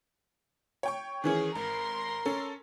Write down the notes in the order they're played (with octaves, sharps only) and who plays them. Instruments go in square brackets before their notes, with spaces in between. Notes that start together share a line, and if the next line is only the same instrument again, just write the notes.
[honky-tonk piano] C#5 G5 C#6
[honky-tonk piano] D#3 E3 C#4 [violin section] G#4
[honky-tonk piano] G#1 [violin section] A#4 C6
[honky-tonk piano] C#4 A4